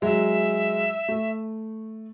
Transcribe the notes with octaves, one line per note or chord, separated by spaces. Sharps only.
F#3 G#3 E5
A3